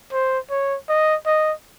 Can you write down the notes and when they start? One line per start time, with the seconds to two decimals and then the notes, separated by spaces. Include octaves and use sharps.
0.12 C5
0.50 C#5
0.88 D#5
1.26 D#5